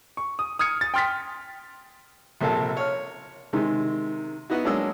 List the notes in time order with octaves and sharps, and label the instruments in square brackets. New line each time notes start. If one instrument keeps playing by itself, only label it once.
[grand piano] C#6
D#6
D#6 F6 G#6 C#7
A6
G5 C6 F6 A6 B6
[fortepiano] A#1 C3 A#3 A4 A5
C#5 F6
C3 D#3 G#3
B3 D#4 E4 F#4
F#3 G#3 A#3 D4 D#5 E6